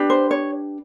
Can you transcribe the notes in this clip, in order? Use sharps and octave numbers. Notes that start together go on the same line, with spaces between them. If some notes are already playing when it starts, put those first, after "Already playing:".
Already playing: D4 G4 B4
C5
C#5